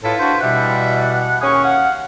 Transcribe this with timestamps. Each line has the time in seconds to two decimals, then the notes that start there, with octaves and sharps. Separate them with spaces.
0.03 A2 E4 F4 A4 B4
0.20 D4 F#4 C5
0.40 B2 E3 G3 E5 F#5
1.41 D#2 C#4 G#4 C#6
1.64 F5 F#5